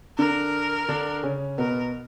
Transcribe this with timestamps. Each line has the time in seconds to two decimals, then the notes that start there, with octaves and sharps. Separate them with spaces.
0.18 D3 D4 A#4
0.89 D3 D4
1.23 C#3 C#4
1.58 B2 B3 A#4